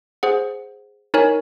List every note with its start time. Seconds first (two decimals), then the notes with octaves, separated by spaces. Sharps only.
0.23 G#4 C5 F#5
1.14 D#4 A#4 C#5 G#5